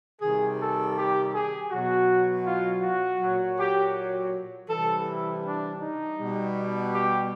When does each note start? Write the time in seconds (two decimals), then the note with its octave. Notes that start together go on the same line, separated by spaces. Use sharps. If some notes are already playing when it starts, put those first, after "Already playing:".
0.21 C3 D#3 G3 G#4
0.59 A4
0.96 G4
1.33 G#4
1.70 B2 F#3 F#4
2.46 F4
2.82 F#4
3.20 A#2 F#3
3.58 G4
4.68 C3 E3 G3 A4
5.07 E4
5.44 D4
5.81 D#4
6.18 B2 G3
6.93 G4